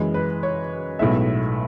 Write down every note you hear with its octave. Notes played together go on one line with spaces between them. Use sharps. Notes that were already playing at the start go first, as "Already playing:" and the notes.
Already playing: F#2 E3 G#3
B4
C#5
B1 A2 G#3 B3 E5